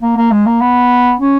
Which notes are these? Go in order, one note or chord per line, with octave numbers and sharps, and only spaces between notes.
A#3
A#3
G#3
A#3
B3
C#4